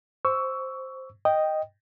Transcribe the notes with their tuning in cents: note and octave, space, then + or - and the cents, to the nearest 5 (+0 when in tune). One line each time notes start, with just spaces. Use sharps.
C5 +0 C#6 +20 E6 +0
D#5 +0 G5 +0